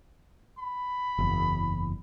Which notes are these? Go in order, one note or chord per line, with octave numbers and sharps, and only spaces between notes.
B5
F#1 E2